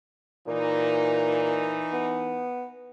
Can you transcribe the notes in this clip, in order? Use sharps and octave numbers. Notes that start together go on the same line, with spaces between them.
A#2 E3 D#4
B3